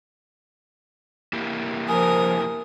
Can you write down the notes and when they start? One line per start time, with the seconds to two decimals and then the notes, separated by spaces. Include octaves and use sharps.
1.33 A#3 E4 G4
1.88 F3 A#4 G#5 D#6